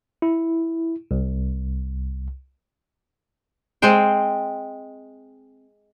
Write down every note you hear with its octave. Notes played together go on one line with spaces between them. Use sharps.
E4
C2
G#3 C4 C5 G5